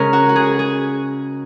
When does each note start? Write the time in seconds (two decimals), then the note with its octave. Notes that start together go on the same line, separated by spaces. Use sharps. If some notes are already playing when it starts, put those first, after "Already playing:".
Already playing: C#3 G#3 C#4 A#4
0.13 F#4
0.29 F#4
0.36 G#4
0.59 G#4